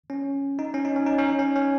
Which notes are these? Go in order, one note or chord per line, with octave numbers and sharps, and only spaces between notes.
C#4
D#4
C#4
D#4
C#4
D#4
C#4
D#4
C#4
C#4